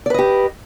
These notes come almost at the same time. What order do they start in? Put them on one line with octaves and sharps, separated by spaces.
D5 B4 D#5 G4